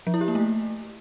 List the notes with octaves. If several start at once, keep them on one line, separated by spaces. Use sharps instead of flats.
F3
E4
G4
A#3
A3